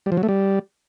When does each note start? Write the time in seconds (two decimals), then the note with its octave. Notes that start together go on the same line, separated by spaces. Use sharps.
0.06 G3
0.12 F3
0.17 F#3
0.23 A3
0.29 G3